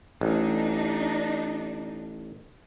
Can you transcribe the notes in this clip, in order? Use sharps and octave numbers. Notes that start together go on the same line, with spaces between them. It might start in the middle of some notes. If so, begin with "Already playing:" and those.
A1 D4 D#4